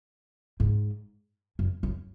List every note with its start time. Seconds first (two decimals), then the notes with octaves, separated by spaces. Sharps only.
0.60 G#2
1.59 F#2
1.83 F#2